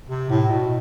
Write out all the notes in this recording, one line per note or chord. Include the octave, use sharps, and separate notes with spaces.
C3
A2
B2